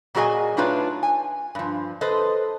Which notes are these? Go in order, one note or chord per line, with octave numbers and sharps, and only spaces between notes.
A#2 F#3 F#4 G#4 D#5 G#5
A3 D4 D#4 F4 B4 C#5
G#5
G2 F3
A4 B4 C5 D#5